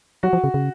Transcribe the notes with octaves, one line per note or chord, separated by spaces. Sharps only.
F#3 F#4
F3
C#3
C#3